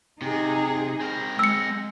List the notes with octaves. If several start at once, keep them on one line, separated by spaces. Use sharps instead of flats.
C3 D#4 G#4
C4 A#4
G#3 E6 C#7